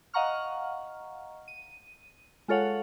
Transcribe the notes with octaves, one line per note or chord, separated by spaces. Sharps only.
D#5 F5 F#5 A#5 C#6 F6
D#7
G#3 F4 A4 C#5 F5 F#5